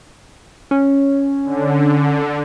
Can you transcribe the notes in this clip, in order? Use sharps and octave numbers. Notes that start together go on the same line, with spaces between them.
C#4
D3